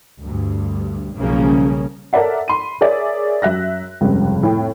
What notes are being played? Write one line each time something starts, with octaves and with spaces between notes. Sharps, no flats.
D2 G2
B1 C#3 F3 G3 A#3 C#4
A4 A#4 C#5 D5 E5 F#5
B5 C6 D#7
G#4 A#4 C#5 D5 E5
F#2 E5 F#6 A#6
F1 C#2 G2 C#3
F2 A2 G5